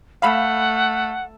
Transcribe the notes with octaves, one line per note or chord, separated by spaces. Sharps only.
A3 F5 F#5 B5